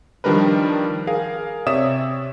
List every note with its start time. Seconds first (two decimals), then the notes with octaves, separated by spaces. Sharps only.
0.24 D#3 F3 G3 D4 A#4 B4
1.07 G#4 A#4 F5
1.66 C3 C#5 D5 E5 D#6 E7